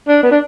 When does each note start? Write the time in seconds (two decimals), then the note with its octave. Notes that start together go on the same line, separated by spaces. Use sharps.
0.08 D4
0.23 B3
0.31 D4